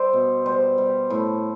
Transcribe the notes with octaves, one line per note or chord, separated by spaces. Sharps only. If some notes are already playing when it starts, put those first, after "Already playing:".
Already playing: G3 C5 D5 E5
B2
G3 C5
G3
A2